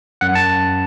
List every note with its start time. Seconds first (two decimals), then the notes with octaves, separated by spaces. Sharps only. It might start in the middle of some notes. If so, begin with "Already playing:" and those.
0.21 F#2 F#5
0.35 A5